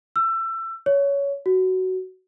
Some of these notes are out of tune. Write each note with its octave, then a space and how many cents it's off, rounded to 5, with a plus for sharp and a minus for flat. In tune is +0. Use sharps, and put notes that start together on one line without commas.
E6 +25
C#5 +15
F#4 +15